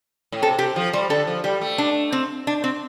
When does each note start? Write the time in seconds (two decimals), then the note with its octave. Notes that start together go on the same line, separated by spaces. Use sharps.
0.32 A2
0.42 C3 A4
0.59 C3 G4
0.76 F3
0.93 G3 C5
1.10 D3 A4
1.27 F3
1.44 G3 G4
1.61 A3
1.78 D4
2.12 C4
2.47 D4
2.64 C4